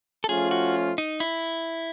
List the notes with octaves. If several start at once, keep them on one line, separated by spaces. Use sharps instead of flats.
A4
F3 A3 C#4 F4 G#4
F#4
D#4
E4